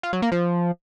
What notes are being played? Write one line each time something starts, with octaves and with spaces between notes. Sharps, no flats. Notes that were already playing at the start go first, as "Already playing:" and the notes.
F4
F#3
A#3
F3